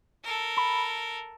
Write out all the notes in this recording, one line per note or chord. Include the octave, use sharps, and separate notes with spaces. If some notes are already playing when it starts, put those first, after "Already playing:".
A4 A#4
B5